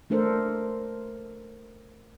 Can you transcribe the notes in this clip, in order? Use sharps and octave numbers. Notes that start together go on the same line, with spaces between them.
A3 D4 A4 A#4 C5